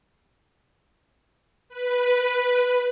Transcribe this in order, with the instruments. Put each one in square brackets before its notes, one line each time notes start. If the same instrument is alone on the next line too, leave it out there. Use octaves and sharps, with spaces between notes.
[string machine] B4